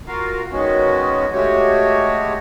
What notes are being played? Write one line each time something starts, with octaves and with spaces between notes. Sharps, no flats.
F4 F#4 A#4 F5
D#3 G#3 B3 C#4 F#4
G#3 A3 F#4 G4 C#5